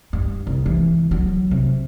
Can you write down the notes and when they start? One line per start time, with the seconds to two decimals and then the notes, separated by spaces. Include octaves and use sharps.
0.13 G2
0.47 C2
0.66 E3
1.11 F#3
1.51 C3